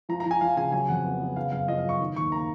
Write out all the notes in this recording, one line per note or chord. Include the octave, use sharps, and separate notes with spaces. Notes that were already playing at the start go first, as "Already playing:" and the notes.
F3 A#5
A#5
F3 G#5
F3 F5
C#3 G#5
F#3 G#5
F2 F#5
B3
B3
C#3 F5
F#2 F5
F3 D#5
F5
F#2
C#6
D#3
D#2 C#6
A#3 A#5